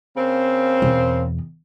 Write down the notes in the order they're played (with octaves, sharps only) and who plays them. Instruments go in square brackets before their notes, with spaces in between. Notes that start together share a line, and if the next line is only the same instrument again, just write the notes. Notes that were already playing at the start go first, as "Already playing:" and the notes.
[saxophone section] C#3 A#3 C4
[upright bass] E2 B2